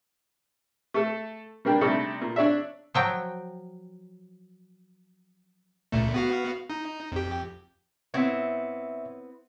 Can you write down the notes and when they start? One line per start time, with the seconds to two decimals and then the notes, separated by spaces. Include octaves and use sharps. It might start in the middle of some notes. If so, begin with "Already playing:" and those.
0.94 A3 A4
1.65 G3 A#3 D4 G4
1.81 C3 G3 A3 D4 D#4 A4
2.21 A#2
2.36 D4 C#5 D5 E5
2.94 F3 F#3 G5
5.92 C#2 A#2 A3
6.14 B3 F#4 F5
6.70 D#4
7.12 F2 G4
8.14 B3 C4 E4 C#5 E5